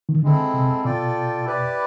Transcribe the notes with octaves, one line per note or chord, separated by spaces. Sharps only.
D#3
D3 G#3 C4 E4 A4
C3
B2 F4 A4 D5 G5
E4 G4 B4 D5